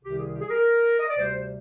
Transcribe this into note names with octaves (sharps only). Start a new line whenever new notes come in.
C2 C3 D#3 G4
G#4
G4
G#4
A#4
D#5
D5
D2 C3 G3 C5